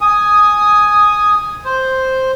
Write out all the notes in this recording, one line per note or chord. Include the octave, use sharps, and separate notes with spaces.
G#5 D#6
C5